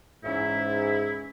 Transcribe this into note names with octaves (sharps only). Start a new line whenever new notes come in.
G#2 E3 C#4 E4 E5